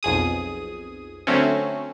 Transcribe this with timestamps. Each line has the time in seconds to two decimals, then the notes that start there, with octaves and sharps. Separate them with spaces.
0.03 B1 F2 G#4 D#6
1.27 D3 F#3 A3 C4 C#4